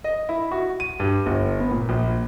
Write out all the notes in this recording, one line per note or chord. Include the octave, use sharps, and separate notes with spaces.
D#5
E4
F#4
D#7
G2
G1
B3
A#2
A#1